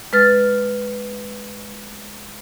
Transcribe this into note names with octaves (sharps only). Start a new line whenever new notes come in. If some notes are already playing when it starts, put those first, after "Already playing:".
G#3 B4 F6 A6